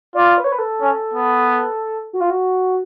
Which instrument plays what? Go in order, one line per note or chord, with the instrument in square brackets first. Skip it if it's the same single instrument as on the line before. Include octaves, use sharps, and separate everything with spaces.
[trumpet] F4 [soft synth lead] D5
[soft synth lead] B4
C#5
B4
A4
[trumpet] C#4
B3
[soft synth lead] F#4
F4
F#4